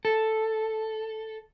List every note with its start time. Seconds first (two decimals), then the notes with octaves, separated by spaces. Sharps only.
0.05 A4